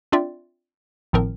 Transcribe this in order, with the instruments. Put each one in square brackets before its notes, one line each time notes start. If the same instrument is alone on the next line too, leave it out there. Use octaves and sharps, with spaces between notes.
[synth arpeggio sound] C4 D4 F4 D5 E5 G5
G#1 A2 F3 C4 A#4